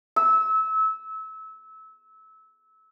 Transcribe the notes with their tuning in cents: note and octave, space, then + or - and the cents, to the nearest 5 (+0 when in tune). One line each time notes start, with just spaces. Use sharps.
E6 -25